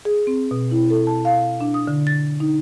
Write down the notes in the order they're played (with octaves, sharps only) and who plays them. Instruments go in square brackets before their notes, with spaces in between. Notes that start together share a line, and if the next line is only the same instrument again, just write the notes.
[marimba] G#4
C4
B2
E4
A4
A5
F5
D4
D#6
D3
A6
D#4